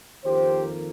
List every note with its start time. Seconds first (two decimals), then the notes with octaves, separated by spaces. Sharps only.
0.24 F2 D#3 A#3 G4 C5